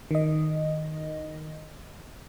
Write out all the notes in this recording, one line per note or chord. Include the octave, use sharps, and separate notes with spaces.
D#3 D#5